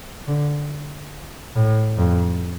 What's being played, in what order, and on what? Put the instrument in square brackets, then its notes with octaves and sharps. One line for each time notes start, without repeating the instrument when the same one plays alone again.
[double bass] D3
A2
F2